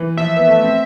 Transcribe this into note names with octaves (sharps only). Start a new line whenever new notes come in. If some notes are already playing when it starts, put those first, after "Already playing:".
Already playing: E3
F3 E5
B3
A3
C4